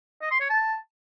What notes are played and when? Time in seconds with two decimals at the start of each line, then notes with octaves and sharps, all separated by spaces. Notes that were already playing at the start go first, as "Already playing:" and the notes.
0.22 D#5
0.31 C6
0.40 C#5
0.50 A5